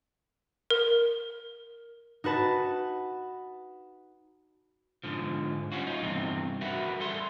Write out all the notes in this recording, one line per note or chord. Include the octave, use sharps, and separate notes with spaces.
A#4
D#4 F#4 B4 A5
G#2 D3 F3
G3 C#4 F4 F#4
D#4 F4
E2 G2 C3 D#3 C4
F#4 A#4 B4 E5 F#5
G3 A4 C6